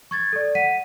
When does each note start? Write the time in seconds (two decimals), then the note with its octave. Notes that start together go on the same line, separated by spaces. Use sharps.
0.11 C#6 G#6 A6
0.33 A4 D5
0.55 F#5 B6 D#7